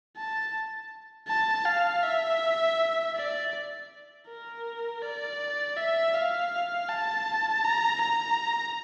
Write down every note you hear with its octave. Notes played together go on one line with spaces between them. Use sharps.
A5
A5
F5
E5
D5
A#4
D5
E5
F5
A5
A#5
A#5